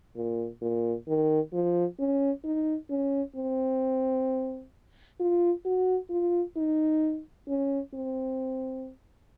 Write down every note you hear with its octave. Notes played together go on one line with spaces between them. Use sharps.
A#2
A#2
D#3
F3
C#4
D#4
C#4
C4
F4
F#4
F4
D#4
C#4
C4